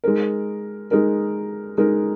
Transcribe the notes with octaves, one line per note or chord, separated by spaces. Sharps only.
G#3 D#4 A#4
G#3 D#4 A#4
G#3 D#4 A#4